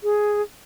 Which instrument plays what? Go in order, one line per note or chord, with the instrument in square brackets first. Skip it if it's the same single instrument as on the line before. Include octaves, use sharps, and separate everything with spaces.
[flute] G#4